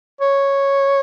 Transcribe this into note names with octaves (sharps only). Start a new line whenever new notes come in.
C#5